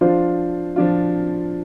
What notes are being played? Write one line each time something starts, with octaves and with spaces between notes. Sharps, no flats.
F3 D4 F4 C5
F3 D4 F4